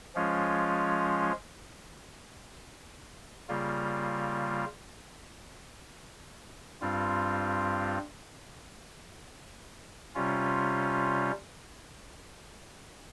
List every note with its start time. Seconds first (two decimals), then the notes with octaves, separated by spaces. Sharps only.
0.15 F3 G#3 C#4 F4
3.49 C#3 G3 A#3 F4
6.81 G2 G3 C4 F4
10.15 C3 G3 C#4 F4